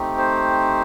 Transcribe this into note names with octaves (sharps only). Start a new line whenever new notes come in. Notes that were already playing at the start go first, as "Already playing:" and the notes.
Already playing: A3 C4 D#4 G4
C5